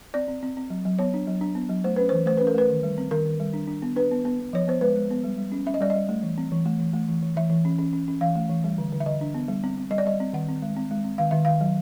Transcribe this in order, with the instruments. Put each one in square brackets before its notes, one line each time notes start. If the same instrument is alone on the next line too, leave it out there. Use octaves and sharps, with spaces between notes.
[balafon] C4 D5
C4
C4
C4
F#3
F#3
B3 C#5
D4
F#3
D4
B3
F#3
A3 C5
C#4 B4
C5
E3
A3 C5
C#4 B4
A#4
A3 B4
D#3
G3
C4
D#3 A#4
D#3
G3
D4
D4
B3
D4 B4
B3
B3
B3
F3 C#5
B3 C5
G#3 B4
G#3
B3
G3
G3
C#4
C#4 E5
D#5
G3 D5
D#5
G3
A3
E3
C4
E3
A3
E3
A3
E3
E3
E3 E5
E3
C#4
C#4
C#4
C#4
E3 F5
A3
E3
G3
D3
D3
E5
D3 D#5
D4
B3
G3
C4
C4
G3 D#5
D5
G3 D#5
C4
D#3 F#5
C4
G#3
C4
G#3
C4
D#3 F5
D#3 E5
D#3 F5
F#3